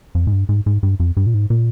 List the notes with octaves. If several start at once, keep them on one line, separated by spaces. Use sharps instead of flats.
F2
G#2
G2
G#2
G#2
G2
F2
G2
A#2
G#2
A#2